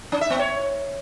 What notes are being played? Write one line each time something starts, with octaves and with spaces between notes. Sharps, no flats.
C#4
E5
B3
C#5